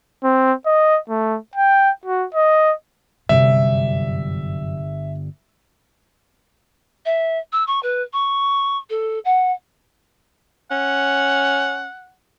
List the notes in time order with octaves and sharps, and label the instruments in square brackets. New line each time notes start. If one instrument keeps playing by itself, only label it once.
[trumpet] C4
D#5
A3
G5
F#4
D#5
[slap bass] G1 G3 [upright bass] F#2 C3 [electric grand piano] E5
[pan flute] E5
E6
C#6
B4
C#6
A4
F#5
[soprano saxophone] C#4 [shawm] F#5